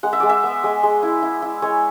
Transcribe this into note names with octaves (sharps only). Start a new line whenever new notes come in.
G#3 F#5
E5
G#3 D5
E5
B3
G#3
G#3
E4
E4
E4
G#3 C#5